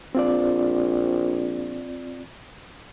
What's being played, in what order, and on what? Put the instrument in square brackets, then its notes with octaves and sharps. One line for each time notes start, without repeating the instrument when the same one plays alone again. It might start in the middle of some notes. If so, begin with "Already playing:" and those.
[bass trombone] A#1 [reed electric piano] C4 F4 D5